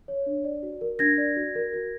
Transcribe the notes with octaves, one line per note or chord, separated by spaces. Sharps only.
C#5
D4
D5
F#4
A#4
D4 G#6 A#6
D5
F#4
A#4
F#4